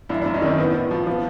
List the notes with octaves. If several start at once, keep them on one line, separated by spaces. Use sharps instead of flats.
F#2 D4 E4
F#2 D4 E4
C#4 D#4
D#3 C4 D4
A2 B3
A2
F3
F3 B3